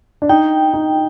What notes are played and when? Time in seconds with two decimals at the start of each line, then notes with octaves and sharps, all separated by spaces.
0.22 D4
0.29 D#4 G5
0.74 D#4